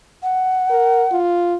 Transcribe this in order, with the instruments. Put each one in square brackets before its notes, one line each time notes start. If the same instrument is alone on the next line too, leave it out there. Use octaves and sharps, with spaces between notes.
[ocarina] F#5
[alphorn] A#4
F4